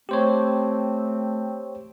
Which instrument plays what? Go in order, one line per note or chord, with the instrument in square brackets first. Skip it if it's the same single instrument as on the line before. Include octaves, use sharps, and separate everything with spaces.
[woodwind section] A3 C4 [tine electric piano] G4 C5 C#5